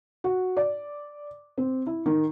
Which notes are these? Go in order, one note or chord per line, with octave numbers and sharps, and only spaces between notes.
F#4
D5
C4
E4
D#3